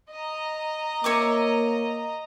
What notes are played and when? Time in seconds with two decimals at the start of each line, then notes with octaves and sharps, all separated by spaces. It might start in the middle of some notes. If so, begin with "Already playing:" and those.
0.11 D#5 A#5
1.04 A#3 C#5 E5 D6